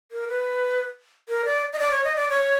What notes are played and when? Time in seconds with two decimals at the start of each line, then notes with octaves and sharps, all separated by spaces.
0.12 A#4
0.28 B4
1.29 A#4
1.45 D5
1.73 D#5
1.79 D5
1.91 C#5
2.04 D#5
2.16 D5
2.29 C#5